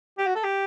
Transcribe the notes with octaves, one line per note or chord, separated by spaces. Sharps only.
G4
F#4
A4
G4